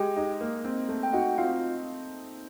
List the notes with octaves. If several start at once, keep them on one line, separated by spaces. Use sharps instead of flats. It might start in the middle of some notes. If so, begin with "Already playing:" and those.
Already playing: G#3 G4 G5
D#4
A#3
C4
A3
G5
D#4 F#4 F#5
C4 F4 F5